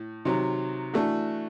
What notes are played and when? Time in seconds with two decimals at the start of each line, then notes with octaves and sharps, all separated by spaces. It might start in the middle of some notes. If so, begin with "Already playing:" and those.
Already playing: A2
0.25 C3 D#3 F#3
0.94 E3 A3 D4 F#4